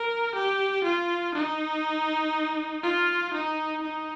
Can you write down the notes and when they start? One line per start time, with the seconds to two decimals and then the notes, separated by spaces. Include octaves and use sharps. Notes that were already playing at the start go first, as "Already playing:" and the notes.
Already playing: A#4
0.35 G4
0.84 F4
1.35 D#4
2.83 F4
3.34 D#4
3.83 D#4